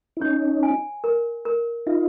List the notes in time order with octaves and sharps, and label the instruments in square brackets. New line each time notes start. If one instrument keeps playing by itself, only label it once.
[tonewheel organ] E4
[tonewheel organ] C#4 D#4 [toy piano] C#5
[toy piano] G#5
A#4
A#4
[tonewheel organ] D#4 F4 [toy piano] E5